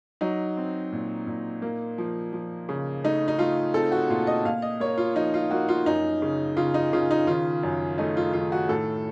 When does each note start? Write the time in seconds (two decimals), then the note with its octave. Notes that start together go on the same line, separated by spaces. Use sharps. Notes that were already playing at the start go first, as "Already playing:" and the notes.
0.21 F#3 D#4
0.57 C4
0.92 A#2
1.27 A#2
1.62 A#3
1.98 F3
2.33 F3
2.69 C#3
3.04 A3 D#4
3.28 D#4
3.39 A3 F4
3.74 C4 A4
3.92 F#4
4.10 A#2 F4
4.27 D#5
4.45 A#2 F5
4.62 D#5
4.80 A#3 C#5
4.98 F4
5.15 F3 D#4
5.34 F4
5.51 A#3 F#4
5.69 F4
5.86 F#2 D#4
6.22 C#3
6.57 C#3 F4
6.74 D#4
6.93 C#3 F4
7.11 D#4
7.27 D#3 F4
7.63 F#2
7.98 A3 D#4
8.17 F4
8.33 D#3 F4
8.52 F#4
8.69 A2 A4